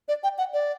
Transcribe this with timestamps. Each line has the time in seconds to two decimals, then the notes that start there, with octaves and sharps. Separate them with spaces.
0.08 D5
0.24 G5
0.38 F#5
0.53 D5